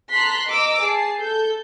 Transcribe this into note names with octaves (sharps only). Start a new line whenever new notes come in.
A5 A#5 C6 F#6 B6
D#5 A#5 D6 E6
G#4 A5 C7
A4 G6